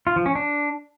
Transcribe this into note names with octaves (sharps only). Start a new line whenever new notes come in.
F4
F3
C#4
D4